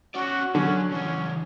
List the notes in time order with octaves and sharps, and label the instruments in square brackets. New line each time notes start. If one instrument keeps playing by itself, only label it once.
[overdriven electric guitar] C#4 D5 [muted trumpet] F#4
[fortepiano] D3 [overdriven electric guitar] F#3 [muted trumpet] C#4
[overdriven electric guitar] C#3 E3 [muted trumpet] C#4